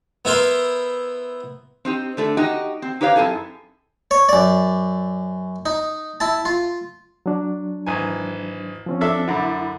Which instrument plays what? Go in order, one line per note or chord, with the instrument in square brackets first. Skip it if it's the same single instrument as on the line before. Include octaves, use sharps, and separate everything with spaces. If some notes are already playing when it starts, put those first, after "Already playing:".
[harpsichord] B3 E4 A#4 C5
[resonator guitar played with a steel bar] C4 D#4 G4
D3 A3 A4
D#4 F#4 G4 D#5
C4
D#4 G4 B4 C#5 F5
F#2 C4 E4 G#4 A4
[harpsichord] C#5
F#2 D5
D#4
E4 A5
F4
[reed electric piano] F#3 D4
[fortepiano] G#1 E3 G#5
[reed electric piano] F3 C4 C#4
[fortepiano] D4 A4 E5
[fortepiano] F#2 D3 [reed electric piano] E4 B5